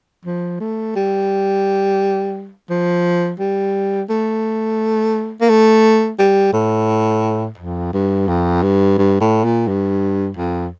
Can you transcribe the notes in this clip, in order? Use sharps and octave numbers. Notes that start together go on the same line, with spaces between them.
F3
A3
G3
F3
G3
A3
A#3
A3
G3
A2
F2
G2
F2
G2
G2
A2
A#2
G2
F2